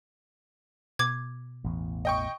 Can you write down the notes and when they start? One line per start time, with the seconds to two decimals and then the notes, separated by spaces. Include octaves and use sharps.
0.99 B2 D6 G#6
1.64 A1 E2
2.05 D#5 G5 C#6